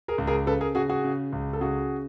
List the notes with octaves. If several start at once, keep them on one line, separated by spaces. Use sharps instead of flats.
G#4 A#4
C#2
G#4 A#4
C#3 A4 B4
G#4 A#4
C#3 F#4 G#4
F#4 G#4
C#3
C#2
A4
C#3 F#4 G#4